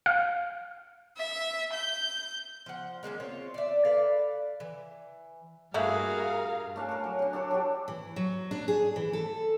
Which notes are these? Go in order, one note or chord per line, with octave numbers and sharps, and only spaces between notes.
F5
E5
G6
F3 F#5
G#3 A#3 C4 C#4
C4 F4 C#5
D5 E5
A4 B4 D5 F5
E3
G2 A3 A#3 E4 F#4 G#4 A#4 F5
A3 D4 F5 G#5
A#4 C#6
F#3
D3 D4
D4 A4 C#5 D6
F#3 G4
E3
F#3
D4
G#4
E3
A4